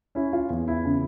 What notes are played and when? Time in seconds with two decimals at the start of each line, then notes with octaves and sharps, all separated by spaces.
0.15 C#4 E4
0.33 F4
0.50 E2
0.68 E4
0.85 C#3